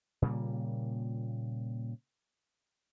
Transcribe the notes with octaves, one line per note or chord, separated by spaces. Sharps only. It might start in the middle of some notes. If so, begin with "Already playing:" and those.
A#2 C#3 G3 A#3